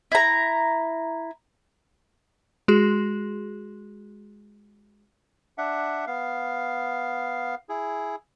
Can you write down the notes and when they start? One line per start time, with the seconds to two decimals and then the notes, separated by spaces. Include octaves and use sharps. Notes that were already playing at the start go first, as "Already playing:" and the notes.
0.12 E4 A#5
2.68 G#3 F#4 G#4
5.58 D4 E5 F#5
6.07 B3 F5
7.69 E4 G#4